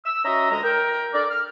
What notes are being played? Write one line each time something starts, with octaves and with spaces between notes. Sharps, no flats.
E6
C#4 F#4 D#5 E5 A#5
D2 G#3 D#5 A#5
A#4 G5
D4 A4 A#4 D5
F6